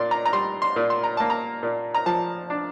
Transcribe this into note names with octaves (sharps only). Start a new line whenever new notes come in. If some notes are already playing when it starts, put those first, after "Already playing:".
Already playing: A#2 D5 C6
A#5
A#5
G3 C6
C6
A#2
C6
A#5
A#3 A5
A#5
A#2
A#5
F3 A5
D4